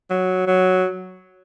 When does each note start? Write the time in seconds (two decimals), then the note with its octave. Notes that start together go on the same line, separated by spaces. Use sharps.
0.10 F#3
0.47 F#3